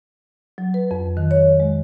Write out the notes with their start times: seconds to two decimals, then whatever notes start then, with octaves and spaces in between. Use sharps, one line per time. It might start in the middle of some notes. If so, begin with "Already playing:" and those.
0.58 F#3
0.74 B4
0.91 F2
1.17 D#3
1.31 C#5
1.60 G#3